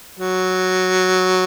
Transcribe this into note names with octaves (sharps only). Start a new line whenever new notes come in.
F#3